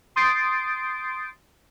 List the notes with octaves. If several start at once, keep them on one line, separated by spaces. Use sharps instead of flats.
C6 D#6 G6 A6 C7 D7